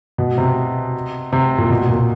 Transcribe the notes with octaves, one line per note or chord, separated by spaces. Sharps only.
B2
C3
C3
A#2
B2
A#2